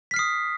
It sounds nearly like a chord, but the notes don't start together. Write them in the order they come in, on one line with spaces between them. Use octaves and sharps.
B6 F6 C7 D#6